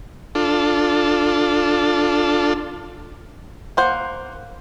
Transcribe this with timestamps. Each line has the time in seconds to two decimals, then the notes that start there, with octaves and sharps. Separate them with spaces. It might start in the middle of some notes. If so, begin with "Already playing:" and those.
0.35 D4 F4 A4
3.77 A#3 C5 F#5